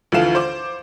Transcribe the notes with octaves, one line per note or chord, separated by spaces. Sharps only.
D2 E3 F3 A4 F5 E7
C5 D6